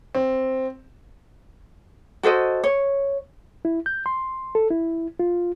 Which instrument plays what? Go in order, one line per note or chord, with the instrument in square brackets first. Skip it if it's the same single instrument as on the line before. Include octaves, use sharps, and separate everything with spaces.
[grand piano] C4
[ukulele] F#4 A4 C5 D#5
C#5
[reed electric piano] E4
G6
C6
A4
E4
F4